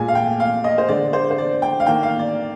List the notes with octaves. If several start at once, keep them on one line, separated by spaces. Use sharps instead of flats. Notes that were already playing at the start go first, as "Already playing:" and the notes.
Already playing: A#2 G#3 G#5
F5
G5
F5
D#5
C5
D3 G#3 D5
C5
C5
D5
G5
F5
D#3 A#3 G5
F5
D5